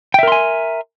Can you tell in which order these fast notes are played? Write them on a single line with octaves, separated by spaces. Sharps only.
G5 E5 A#4 C6 G#5